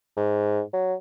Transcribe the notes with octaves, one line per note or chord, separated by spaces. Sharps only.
G#2
F#3